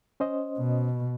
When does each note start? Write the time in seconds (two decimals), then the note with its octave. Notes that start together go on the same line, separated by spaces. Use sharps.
0.20 C#4 C5 D#5
0.58 B2